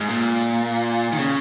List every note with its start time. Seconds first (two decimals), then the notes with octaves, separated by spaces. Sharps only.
0.01 G#2
0.09 A#2
1.12 D#3
1.18 C#3